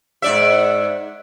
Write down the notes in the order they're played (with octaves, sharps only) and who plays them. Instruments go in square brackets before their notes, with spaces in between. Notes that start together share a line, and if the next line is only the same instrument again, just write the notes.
[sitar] G#2 D5 E5